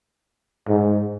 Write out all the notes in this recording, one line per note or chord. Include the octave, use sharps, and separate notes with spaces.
G#2